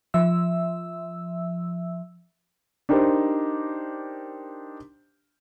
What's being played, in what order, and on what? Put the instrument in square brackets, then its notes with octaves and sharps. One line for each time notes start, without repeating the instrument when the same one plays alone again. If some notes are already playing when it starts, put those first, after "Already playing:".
[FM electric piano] F3 E5 E6
[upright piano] D4 D#4 G4 A#4 C5